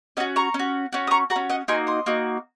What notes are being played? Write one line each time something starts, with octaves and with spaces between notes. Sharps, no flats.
C#4 F#4 D#5 F#5
A#5 C#6
C#4
F#4
C#4 F#4
D#6
A#5 C#6
F#4 F#5 A#5
C#4
D#5 F#5
A#3 D#4 F#4 G#5 C6
C6 D#6
A#3 D#4 F#4